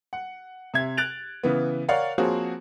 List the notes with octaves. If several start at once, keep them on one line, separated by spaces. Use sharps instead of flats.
F#5
C3 E5 G#6
F#6 A6 D7 F7
C#3 E3 B3
A#4 C#5 D5 F5 F#5
F3 A#3 C4 F#4 G#4 C#5